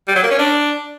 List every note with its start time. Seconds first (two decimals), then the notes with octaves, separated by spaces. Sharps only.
0.08 G3
0.16 F#3
0.23 A#3
0.31 C#4
0.39 D4